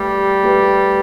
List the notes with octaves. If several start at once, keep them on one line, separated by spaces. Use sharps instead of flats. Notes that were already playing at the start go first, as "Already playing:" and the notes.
Already playing: G3 A3 G4 B4
A3 G4 B4